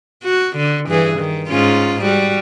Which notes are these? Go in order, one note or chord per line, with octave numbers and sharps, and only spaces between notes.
F#4
D3
G2 E3 G#4
D#3
G#2 C#4 F4
G3 F#4